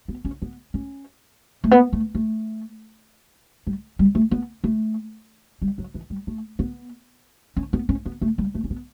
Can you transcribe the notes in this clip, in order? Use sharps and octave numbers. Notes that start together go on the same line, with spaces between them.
B3
C#4
B3
C#4
A3
B3
A3
A3
G3
G3
A3
B3
A3
G3
F#3
E3
G3
A3
B3
C#4
B3
C#4
B3
A3
G3
A3
C#4
B3